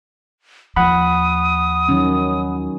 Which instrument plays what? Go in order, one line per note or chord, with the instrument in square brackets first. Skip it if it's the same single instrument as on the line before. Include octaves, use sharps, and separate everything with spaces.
[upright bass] D#2 F3 [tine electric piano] F#5 B5 [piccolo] D#6
[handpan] D#3 F#3 C#4